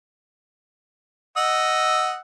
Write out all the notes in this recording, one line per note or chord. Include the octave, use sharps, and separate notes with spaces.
D#5 F#5 E6